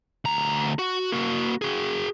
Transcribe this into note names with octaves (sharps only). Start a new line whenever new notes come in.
D2 A#5
F#4
A#3 F#4
F#4 G#4